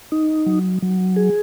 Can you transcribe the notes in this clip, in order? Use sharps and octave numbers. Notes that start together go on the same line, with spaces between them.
D#4
F#3
F#3
G#4